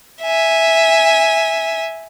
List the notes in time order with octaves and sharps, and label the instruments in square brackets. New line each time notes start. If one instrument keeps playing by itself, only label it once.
[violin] E5 G#5